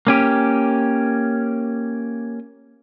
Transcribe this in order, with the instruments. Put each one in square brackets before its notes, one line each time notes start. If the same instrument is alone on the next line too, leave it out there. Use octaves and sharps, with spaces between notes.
[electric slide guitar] A#3 C#4 G4